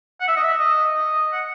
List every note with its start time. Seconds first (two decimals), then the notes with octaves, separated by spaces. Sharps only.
0.21 F#5
0.28 E5
0.36 D#5
0.43 E5
0.59 D#5
0.95 D#5
1.32 F#5